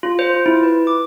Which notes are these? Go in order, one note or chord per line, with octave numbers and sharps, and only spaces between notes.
F4
C5
F4
E4
B4
D6